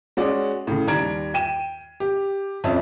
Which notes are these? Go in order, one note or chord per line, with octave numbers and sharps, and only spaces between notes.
G#3 C#4 F#4 D5
A2 C#3
D#2 G3 A#5 G#6 D7
G5 D#7 E7
G4
F2 C#4 E5